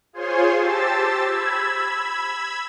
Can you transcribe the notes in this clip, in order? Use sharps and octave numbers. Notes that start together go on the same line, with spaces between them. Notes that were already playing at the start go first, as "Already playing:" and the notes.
F4 G#4 C5 C#5 G#5 C6
G4 C5 A5 E6 A6
B5 E6 G#6